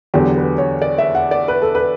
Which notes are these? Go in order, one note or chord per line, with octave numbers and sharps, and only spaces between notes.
E2 D3 F#3 G4
B4
C#5
D5
E5
F#5
D5
B4
A4
B4